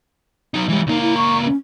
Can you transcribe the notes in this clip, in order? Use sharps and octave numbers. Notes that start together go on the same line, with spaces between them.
F#3 D#4
E3 G3 G#3
C#2 A#3 D#4
E4
C#6
C#4